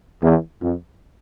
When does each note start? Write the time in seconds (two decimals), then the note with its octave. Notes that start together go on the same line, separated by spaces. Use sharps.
0.23 E2
0.62 F2